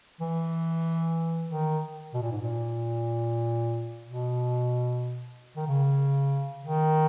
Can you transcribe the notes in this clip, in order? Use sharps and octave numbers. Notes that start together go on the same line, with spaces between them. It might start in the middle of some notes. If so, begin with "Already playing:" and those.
E3
D#3
B2
A#2
G#2
A#2
B2
D#3
C#3
D#3